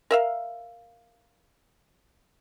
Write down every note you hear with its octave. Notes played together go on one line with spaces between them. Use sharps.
A#4 E5 F5